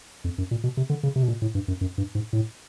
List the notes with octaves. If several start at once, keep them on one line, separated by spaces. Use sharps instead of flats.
F2
F#2
A#2
B2
C3
D3
C#3
C3
B2
A#2
A2
G2
F#2
F#2
G2
G#2
A2